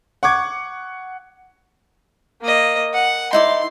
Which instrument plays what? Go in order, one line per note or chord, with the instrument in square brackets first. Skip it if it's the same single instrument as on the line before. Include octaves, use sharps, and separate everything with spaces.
[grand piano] F#5 C#6 D6 G#6
[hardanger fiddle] A#3 D#5
F#5
[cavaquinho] D#4 E4 D5 [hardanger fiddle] C6